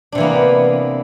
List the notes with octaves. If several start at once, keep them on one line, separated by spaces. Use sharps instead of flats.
C3 E3 A#3 B3 D4